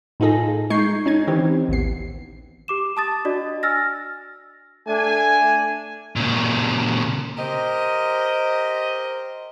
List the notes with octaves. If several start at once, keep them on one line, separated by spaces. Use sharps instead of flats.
A2 D#4 F4 G#4 A4 A#6
G#3 D#4 C#6 G6 G#6 C7
C#4 D#4 G#6
D#3 E3 C4 G4
A1 D#2 B3 C7
G4 D6 E7
A5 D#6 A6
D4 F#4 D5 D#5
G#5 E6 F6 A6 A#6
A3 D4 G#5
A#2 C#3
G4 A#4 C5 D#5